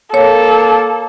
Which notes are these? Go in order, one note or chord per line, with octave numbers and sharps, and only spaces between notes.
A#3 A4 C#5